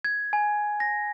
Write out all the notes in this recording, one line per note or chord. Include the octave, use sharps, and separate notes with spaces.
G#6
G#5
A#6